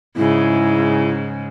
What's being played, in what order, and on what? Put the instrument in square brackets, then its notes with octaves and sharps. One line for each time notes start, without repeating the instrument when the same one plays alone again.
[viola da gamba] G#2 C#3 [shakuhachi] E4